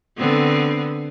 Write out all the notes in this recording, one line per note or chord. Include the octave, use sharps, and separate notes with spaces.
D3 B3 C4